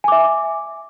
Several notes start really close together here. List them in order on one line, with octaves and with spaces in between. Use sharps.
G#5 D6 E5